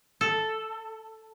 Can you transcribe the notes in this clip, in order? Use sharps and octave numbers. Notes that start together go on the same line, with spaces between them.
A4